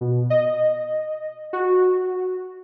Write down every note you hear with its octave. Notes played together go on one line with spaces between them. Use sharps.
B2
D#5
F#4